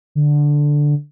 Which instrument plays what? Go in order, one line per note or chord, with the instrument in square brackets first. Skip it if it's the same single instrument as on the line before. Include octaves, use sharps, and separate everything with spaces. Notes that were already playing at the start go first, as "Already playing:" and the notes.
[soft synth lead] D3